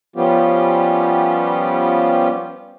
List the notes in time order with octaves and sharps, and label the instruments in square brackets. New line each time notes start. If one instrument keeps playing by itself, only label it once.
[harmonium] F3 G3 B3 C#4 F4 G4